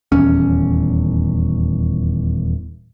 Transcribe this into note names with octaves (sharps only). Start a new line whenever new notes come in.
D#1 E2 C#4